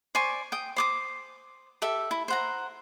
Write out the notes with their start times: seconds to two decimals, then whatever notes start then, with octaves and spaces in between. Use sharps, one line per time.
0.15 C5 D5 G#5 C#6
0.52 G5 D#6
0.76 C5 D6 D#6
1.82 G4 A4 E5
2.11 E4
2.28 C5 F#5 A#5